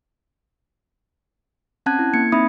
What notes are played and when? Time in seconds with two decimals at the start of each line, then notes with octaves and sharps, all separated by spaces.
1.86 C4 C#4 F#5 A5 F#6 G#6
1.99 E4
2.14 A#3 G#6 C#7
2.32 C4 D#4 E5 B5 D#6